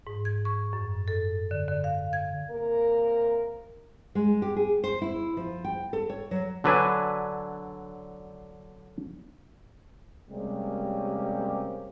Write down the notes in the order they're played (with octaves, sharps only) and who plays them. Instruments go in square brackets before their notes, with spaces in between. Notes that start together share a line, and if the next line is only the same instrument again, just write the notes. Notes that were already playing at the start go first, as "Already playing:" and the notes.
[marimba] G#2
G#6
C#6
F#2
A4
D3
D3
F5
G#6
[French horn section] C3 A#3 A#4
[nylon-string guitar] G#3
G4
G#4
C5
E4
F3
G5
A4
C#5
F#3
[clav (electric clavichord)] D3 F#3 D4 B4 G#5
[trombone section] C3 G3 G#3 A#3 C#4 G4